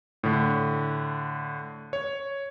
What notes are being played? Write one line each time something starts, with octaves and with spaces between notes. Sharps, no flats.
A2 D3
C#5